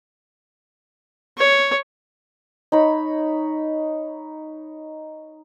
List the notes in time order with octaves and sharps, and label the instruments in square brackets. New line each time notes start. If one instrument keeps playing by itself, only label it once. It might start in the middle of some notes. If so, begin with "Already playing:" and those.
[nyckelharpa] C#5
[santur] D#4 C#5 B5